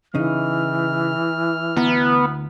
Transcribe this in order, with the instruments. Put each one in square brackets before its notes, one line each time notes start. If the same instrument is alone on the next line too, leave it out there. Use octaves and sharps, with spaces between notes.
[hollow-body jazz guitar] C#3 D#4 [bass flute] E3 [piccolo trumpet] F6
[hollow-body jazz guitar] D2 E4 A#5 [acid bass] B3